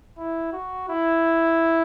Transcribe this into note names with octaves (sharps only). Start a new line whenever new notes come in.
E4
F#4
E4